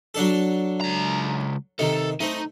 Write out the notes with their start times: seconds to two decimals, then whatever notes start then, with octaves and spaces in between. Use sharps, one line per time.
0.14 F#3 D4 A4
0.81 C#2 A#5
1.79 C3 D#3 A4
2.21 A3 C4 D#4